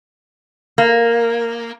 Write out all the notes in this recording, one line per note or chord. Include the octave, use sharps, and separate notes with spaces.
A#3